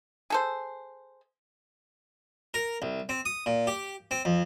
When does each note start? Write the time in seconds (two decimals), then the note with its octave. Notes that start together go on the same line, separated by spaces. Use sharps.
0.30 G#4 A4 C5
2.54 A#4
2.82 C2
3.09 C4
3.25 D#6
3.46 A#2
3.67 G4
4.11 C4
4.25 F2